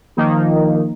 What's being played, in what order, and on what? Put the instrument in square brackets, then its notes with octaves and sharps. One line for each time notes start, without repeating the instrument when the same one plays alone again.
[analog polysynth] D#3 F3 A#3 D#4